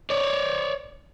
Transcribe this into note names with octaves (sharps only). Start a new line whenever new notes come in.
C#5 D5